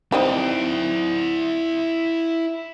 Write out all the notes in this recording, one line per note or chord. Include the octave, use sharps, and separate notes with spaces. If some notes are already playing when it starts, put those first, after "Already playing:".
G3 C4 D#4 E4 D5